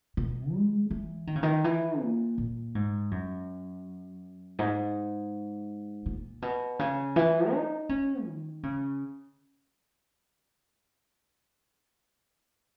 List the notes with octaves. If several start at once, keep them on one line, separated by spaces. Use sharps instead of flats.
B2
G#3
E3
D#3
C#3
D#3
E3
A#2
A#2
G#2
F#2
G#2
A#2
B2
C#3
E3
D#4
C#4
D#3
C#3